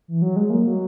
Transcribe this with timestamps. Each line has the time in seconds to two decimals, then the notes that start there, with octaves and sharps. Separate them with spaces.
0.08 E3
0.22 F#3
0.36 G#3
0.50 A#3
0.67 F#3